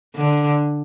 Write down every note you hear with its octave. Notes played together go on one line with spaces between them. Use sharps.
D3